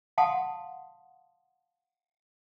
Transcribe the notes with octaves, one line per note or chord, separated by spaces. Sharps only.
F5 F#5 A5 C6 D#6